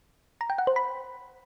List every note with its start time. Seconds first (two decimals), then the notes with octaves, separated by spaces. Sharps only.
0.41 A#5
0.50 G5
0.58 F#5
0.67 C5
0.76 B5